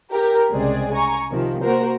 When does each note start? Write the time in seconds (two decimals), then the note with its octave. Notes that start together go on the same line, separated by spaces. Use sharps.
0.12 G4 A#4
0.51 C2 C#3 G#3 C4 G#4 D5
0.93 G#5 A#5 C#6
1.31 C3 D#3 F3
1.62 A#3 F#4 A#4 C5